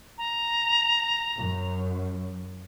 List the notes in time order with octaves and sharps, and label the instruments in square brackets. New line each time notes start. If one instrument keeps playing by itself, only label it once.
[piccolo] A#5
[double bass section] F#2